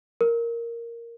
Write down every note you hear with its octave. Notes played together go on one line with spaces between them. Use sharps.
A#4